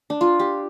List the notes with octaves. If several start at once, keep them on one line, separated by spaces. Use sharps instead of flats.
D4
F4
G4